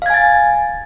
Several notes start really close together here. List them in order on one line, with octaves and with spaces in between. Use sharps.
F5 G#6 G#5 A6